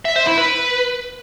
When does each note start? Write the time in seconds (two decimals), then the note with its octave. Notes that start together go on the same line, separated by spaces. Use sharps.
0.05 E5
0.16 C5
0.27 E4
0.38 B4